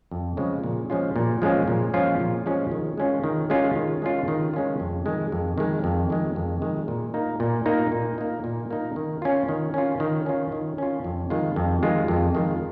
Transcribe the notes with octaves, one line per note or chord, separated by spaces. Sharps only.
F2
C#3 F3 G#3
A#2
F3 G#3 C#4 F4
A#2
F3 G#3 C#4 F4
A#2
F3 G#3 C#4 F4
A#2
F3 G#3 C#4 F4
D#3
G#3 C#4 F4
D#3
G#3 C#4 F4
D#3
G#3 C#4 F4
D#3
G#3 C#4 F4
F2
D#3 G#3
F2
D#3 G#3
F2
D#3 G#3
F2
D#3 G#3
A#2
A#3 D#4
A#2
A#3 D#4
A#2
A#3 D#4
A#2
A#3 D#4
D#3
C#4 F4
D#3
C#4 F4
D#3
C#4 F4
D#3
C#4 F4
F2
D#3 G#3 F4
F2
D#3 G#3 F4
F2
D#3 G#3 F4